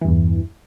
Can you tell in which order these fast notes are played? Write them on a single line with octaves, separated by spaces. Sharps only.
E3 G2 E2